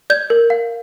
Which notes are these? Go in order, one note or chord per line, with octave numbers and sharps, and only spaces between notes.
D5 G6
A#4
F5